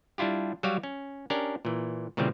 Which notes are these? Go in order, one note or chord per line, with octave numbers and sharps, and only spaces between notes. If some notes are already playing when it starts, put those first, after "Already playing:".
G3 D4 E4 F4 G4
F#3 G3 F#4 G4 C#5 F5
C#4
C#4 D4 G4 A#4
A#2 E3
A#2 C#3 E3 G3 C4